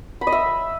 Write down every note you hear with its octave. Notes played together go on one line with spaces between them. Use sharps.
B5
D#5
E5